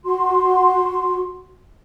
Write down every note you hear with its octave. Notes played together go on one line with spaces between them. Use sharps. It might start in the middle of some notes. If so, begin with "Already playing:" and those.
F#4 C6